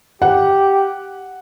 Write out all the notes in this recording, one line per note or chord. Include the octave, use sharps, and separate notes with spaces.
G4 F#5